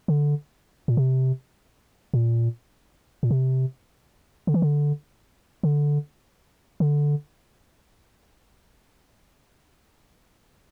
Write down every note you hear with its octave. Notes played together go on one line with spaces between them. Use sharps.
D3
A#2
C3
A#2
A#2
C3
D3
E3
D3
D3
D3